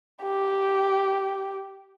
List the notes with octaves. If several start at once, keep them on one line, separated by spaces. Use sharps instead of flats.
G4